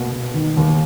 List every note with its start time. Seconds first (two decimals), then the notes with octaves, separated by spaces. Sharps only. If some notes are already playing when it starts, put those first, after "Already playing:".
Already playing: B2 A#3
0.12 B2
0.34 D#3
0.57 D#2